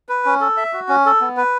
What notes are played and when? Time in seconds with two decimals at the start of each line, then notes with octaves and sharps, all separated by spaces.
0.09 B4
0.25 C#4
0.41 A4
0.57 E5
0.73 F#4
0.89 C#4
1.06 A4
1.21 B3
1.37 B4